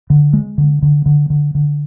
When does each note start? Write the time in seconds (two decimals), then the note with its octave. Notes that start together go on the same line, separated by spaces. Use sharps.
0.10 D3
0.33 G#3
0.58 D3
0.82 D3
1.06 D3
1.30 D3
1.55 D3